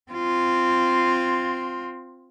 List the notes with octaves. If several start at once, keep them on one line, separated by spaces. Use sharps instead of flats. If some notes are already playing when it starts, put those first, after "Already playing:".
C4 F4